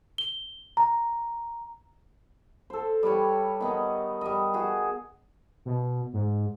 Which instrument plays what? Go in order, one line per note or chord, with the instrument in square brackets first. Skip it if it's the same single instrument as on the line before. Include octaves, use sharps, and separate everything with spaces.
[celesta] G7
A#5
[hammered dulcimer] A4 C5
G3 G4 B4 C#5
D#3 B3 D#5
G3 D#5
F#4 G#4
[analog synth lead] B2
G#2